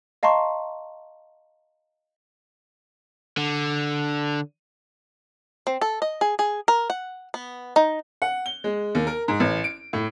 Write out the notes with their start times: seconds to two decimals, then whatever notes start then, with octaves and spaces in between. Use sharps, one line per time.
0.23 D#5 F5 A5 A#5 C6 C#6
3.37 D3
5.67 C4
5.81 A4
6.02 D#5
6.21 G#4
6.39 G#4
6.68 A#4
6.90 F#5
7.34 B3
7.76 D#4
8.22 F#5
8.46 G7
8.64 G#3
8.95 D#2
9.07 A#4
9.28 G#2
9.40 A1
9.64 D7
9.93 A2